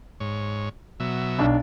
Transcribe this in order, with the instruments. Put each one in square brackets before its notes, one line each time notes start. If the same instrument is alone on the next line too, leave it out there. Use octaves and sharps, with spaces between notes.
[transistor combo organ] G#2 C#5
B2 F#3 E5
[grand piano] B1 D4